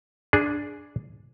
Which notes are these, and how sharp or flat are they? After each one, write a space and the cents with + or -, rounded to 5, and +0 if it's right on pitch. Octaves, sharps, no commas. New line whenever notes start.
D4 +0 G#4 +0